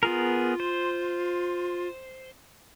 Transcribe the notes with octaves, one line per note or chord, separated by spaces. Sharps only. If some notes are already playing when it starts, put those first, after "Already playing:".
B3 F4 G#4 A#4
C5